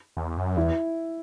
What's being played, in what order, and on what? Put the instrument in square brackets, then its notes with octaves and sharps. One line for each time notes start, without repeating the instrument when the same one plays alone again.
[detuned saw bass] E2
F#2
[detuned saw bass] E2 [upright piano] E4